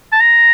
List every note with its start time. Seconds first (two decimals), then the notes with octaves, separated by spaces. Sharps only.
0.12 A5
0.21 A#5